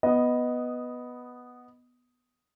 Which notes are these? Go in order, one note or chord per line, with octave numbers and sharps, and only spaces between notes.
B3 D#5